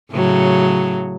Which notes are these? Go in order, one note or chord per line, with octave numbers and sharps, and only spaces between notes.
A2 C#3 F#3